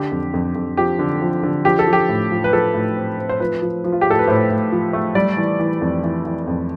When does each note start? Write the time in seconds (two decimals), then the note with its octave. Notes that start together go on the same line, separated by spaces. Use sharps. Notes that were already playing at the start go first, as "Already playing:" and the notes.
Already playing: D3 G4
0.12 F2
0.34 F2
0.55 F2
0.77 F3 G4
0.99 D3
1.21 F3
1.43 D3
1.65 F3 G4
1.79 A4
1.87 F3
1.93 G4
2.09 A2
2.31 F3
2.44 B4
2.53 F3 A4
2.74 A2
2.96 C4
3.18 C4
3.29 C5
3.40 F3 B4
3.62 F3
3.84 F3
3.92 F4
4.01 G4
4.06 A2 A4
4.19 B4
4.28 A2 C5
4.50 A2
4.72 F3
4.93 A3
5.15 G3 D5
5.37 E3
5.60 E3
5.81 F2
6.03 E3
6.25 E3
6.47 F2